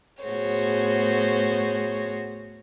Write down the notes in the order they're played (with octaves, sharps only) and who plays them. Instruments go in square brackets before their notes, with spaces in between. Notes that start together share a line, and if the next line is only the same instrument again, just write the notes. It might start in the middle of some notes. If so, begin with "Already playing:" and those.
[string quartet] A2 B3 F#4 G#4 C5 C#5